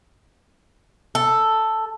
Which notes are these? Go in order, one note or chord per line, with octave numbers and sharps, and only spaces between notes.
A4